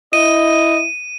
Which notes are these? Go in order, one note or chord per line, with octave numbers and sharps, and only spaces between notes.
E4 D#5 D#7